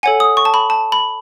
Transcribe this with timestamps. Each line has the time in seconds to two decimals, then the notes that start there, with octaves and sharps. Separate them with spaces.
0.03 A4 C#5 F#5 G#5
0.20 D#6
0.37 C#6
0.45 A5
0.54 B5
0.70 A5
0.92 B5